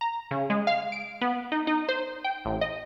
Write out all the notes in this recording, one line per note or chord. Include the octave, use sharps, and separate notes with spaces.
A#5
C#3
G#3
F5
D7
B3
D#4
D#4
C5
G5
A1
D#5